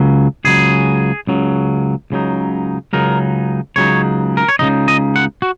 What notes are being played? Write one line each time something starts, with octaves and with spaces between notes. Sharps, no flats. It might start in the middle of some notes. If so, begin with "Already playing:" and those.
Already playing: C#2 C#3 F#3
C#2 C#3 F#3 G#4
C#2 C#3 F#3
C#2 C#3 F#3 D#4
C#2 C#3 F#3 D#4 A#4
C#2 C#3 F#3 D#4 C#5
A#4
C#5
C#2 C#3 F#3 D#4 D#5
D#5
F#5
F#4